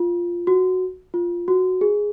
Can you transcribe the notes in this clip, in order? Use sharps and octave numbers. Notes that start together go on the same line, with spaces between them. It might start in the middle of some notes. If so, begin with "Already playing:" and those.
Already playing: F4
F#4
F4
F#4
G#4